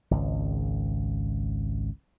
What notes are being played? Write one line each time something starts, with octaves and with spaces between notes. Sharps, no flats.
G#1 C#2